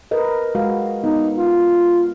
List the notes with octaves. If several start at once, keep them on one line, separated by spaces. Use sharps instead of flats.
A#4 B4 D#5
G#3 F#4 F5
B3 D#4
F4